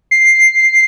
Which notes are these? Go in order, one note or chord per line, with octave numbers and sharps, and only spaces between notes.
C7